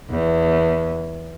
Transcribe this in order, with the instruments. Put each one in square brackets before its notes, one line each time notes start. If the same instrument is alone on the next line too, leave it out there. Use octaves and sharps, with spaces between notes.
[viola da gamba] E2